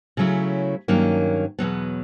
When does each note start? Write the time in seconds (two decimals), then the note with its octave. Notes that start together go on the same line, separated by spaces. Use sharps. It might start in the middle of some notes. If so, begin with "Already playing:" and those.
0.17 C#3 F#3 A3 C#4 E4
0.88 G2 D#3 F#3 A#3 C#4
1.59 E2 B2 F#3 B3